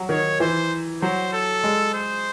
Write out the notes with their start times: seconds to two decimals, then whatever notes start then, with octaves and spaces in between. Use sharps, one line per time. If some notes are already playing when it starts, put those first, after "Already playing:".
Already playing: F#3
0.09 D#3 C#5
0.40 E3 C5
1.02 F#3 C5
1.33 A4
1.64 G#3
1.94 C5